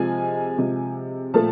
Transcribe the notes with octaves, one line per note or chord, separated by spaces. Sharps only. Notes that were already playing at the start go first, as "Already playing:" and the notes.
Already playing: C3 F3 G#3 G#5
C3 F3 G#3
A#2 F3 A3 A5